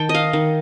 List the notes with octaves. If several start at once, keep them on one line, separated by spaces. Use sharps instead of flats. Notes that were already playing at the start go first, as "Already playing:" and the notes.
Already playing: D#3 G5 A5
D#5
F5
D#3